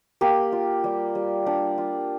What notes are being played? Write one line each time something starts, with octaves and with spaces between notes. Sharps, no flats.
A#3 G4
F4
G3
G3
D4 G4
F4